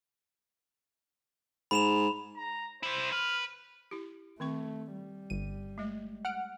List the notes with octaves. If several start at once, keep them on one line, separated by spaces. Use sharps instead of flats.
G#2 B5 E7 F7
A#5
C3 E4 C5
B4 F6
E4 G4
D#3 A3 C4 C#6
G3
G1 D#7
G#3 A3 D#5
F#5 F6 D7